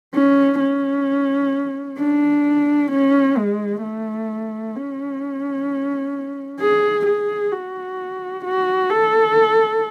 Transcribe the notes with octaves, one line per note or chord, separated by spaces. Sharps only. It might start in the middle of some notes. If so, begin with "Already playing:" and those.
C#4
C#4
D4
C#4
G#3
A3
C#4
G#4
G#4
F#4
F#4
A4